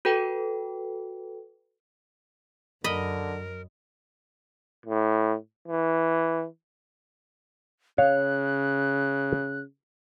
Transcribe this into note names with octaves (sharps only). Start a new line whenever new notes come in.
F#4 A4 B4 G5
F#2 D3 A#4 D#5 B5
A2
E3
C#3 C#5 F5 F#6